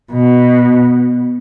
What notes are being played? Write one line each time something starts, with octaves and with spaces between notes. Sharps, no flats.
B2